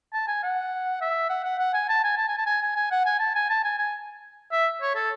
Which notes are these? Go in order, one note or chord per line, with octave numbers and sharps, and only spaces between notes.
A5
G#5
F#5
E5
F#5
F#5
F#5
G#5
A5
G#5
A5
G#5
A5
G#5
G#5
G#5
F#5
G#5
A5
G#5
A5
G#5
G#5
E5
C#5
A4